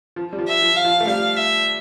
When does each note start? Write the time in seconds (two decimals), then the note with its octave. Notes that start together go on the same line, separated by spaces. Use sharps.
0.16 F3
0.33 G3
0.39 F3
0.47 E5
0.62 F3
0.76 F5
0.85 F3
1.00 A3
1.07 G3 F5
1.36 E5